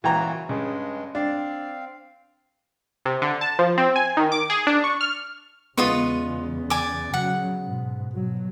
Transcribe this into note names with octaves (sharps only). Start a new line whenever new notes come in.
A#2 C#3 E3 F#4 G5 A#5
G2 C#3 G#3
C4 D4 F5
C3
D3
A5
F3
C4
G#5
D#3
D6
G#4
D4
C#6
F6
E2 C#3 G#3 B3 F4 D#5 C#6
D5 G#5 D6
C#3 F#3 F#5
G#2 B2
B2 F#3